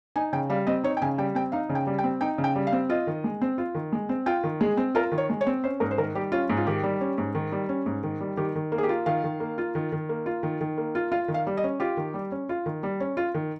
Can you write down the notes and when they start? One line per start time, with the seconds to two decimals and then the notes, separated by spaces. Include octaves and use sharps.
0.16 D#4 G#5
0.33 C#3 G5
0.50 G3 F5
0.67 C4 D#5
0.84 D#4 C#5
0.97 G5
1.02 C#3 G#5
1.18 G3 G5
1.35 C4 G5
1.52 D#4 F5
1.69 C#3
1.75 G5
1.87 G3
1.99 G5
2.04 C4
2.21 D#4 G5
2.38 C#3
2.44 G5
2.56 G3
2.67 F5
2.72 C4
2.89 F4 D#5
3.07 D#3
3.24 G#3
3.41 C4
3.58 F4
3.75 D#3
3.93 G#3
4.09 C4
4.26 F4 G5
4.44 D#3
4.61 G#3 G#4
4.77 C4
4.95 F4 A#4
5.12 D#3
5.18 C#5
5.30 G#3
5.41 C#5
5.47 C4
5.64 C#4 C5
5.80 G#2 A#4
5.91 C5
5.98 D#3 A#4
6.15 G3 G4
6.32 C#4 F4
6.50 G#2
6.57 F4
6.66 D#3 G4
6.83 G3
7.01 C#4
7.18 G#2
7.35 D#3
7.52 G3
7.69 C#4
7.86 G#2
8.03 D#3
8.21 G3
8.37 D#3 G4
8.55 D#3
8.72 A#3
8.78 G#4
8.83 G4
8.89 F4
9.06 D#3 F5
9.24 D#3
9.40 A#3
9.58 F4
9.75 D#3
9.92 D#3
10.09 A#3
10.26 F4
10.43 D#3
10.61 D#3
10.78 A#3
10.95 F4
11.12 F4 F5
11.28 D#3
11.34 F5
11.47 G3
11.57 D#5
11.64 C#4
11.80 F4 G4
11.97 D#3
12.14 G3
12.32 C#4
12.49 F4
12.66 D#3
12.83 G3
13.00 C#4
13.17 F4
13.34 D#3